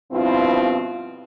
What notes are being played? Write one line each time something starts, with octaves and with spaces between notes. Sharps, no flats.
G2 B2 F3 C4 E4 F4